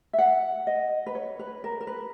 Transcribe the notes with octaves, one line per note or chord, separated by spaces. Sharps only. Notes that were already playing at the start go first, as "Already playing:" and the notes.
E5
F#5
D#5
B4
C#5
B4
A#4
A#4
B4